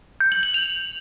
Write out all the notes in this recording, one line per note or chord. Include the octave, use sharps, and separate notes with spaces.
G6
F#7
F#7
F7